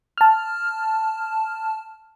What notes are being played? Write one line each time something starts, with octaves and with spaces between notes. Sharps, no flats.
A5 F6